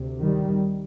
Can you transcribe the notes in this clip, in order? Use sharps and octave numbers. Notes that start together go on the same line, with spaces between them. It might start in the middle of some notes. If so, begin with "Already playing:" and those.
Already playing: D2 C3
D#3 G3